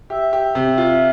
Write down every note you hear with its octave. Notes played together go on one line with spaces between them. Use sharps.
G4 E5
G4
C3
F4